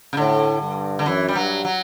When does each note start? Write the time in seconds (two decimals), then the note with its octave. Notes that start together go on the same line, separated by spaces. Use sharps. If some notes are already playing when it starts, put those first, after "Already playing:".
0.13 C#3
0.17 A2 D3
0.62 G2
0.99 D3
1.06 F#2 E3
1.28 G3
1.35 G2 F#3
1.65 F#3